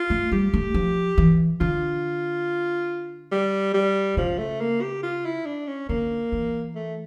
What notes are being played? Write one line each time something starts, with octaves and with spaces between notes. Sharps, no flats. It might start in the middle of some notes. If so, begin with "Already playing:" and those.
Already playing: F4
A3
G3 G4
A3
F3
E3
D3 F4
G3
G3
C#3 F3
A3
A#3
G4
F4
E4
D4
C#4
D3 A#3
E3
A3